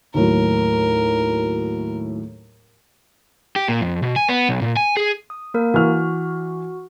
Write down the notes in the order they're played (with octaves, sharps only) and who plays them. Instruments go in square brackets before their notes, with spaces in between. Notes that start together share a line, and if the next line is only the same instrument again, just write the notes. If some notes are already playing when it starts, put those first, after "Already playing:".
[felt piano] D#2 A2 F#3 [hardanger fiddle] A#4
[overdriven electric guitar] G4
A#2
F2
B2
G#5
B3
B1
A#2
G#5
G#4
[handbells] D#6
A#3 A#4
[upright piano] E3 F6 [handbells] F#4